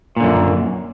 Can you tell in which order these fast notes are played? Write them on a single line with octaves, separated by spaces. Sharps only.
A#2 D3 F#2